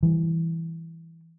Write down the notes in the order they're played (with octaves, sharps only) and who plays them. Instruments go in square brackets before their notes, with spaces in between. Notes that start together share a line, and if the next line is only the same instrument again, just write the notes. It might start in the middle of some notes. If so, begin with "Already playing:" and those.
[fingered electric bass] E3 G3